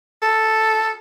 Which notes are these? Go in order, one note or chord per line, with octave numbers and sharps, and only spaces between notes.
A4